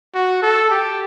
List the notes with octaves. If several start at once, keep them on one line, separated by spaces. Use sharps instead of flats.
F#4
A4
G4